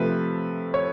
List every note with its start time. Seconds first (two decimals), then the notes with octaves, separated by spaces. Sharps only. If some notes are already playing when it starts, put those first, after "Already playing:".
Already playing: C3 F3 A3 B4
0.74 C#5